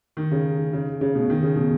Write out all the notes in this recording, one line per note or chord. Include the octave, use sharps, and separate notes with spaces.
D#3
C#3
C#3
C#3
B2
D#3
C#3
B2